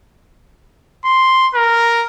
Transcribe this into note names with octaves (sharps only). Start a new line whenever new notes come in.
C6
A#4